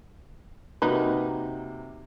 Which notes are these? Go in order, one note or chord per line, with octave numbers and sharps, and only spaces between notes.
C3 A#3 D#4 F#4 B4